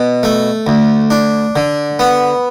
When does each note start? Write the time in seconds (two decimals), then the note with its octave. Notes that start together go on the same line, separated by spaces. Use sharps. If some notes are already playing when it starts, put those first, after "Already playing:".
Already playing: B2
0.23 A3
0.67 D2
1.11 D4
1.56 D3
1.99 B3